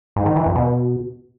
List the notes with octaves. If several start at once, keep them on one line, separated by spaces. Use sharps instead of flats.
G#2
D#3
E3
F2
B2